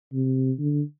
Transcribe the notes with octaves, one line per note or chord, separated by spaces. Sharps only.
C3
D3